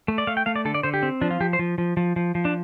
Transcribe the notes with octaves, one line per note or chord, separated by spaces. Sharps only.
A3
D5
A3 F5
G5
A3 F5
D5
D3 A4
D5
D3 C5
G4
C4
F3 D4
F4
F3 G4
C5
F3
F3
F3
F3
F3
D4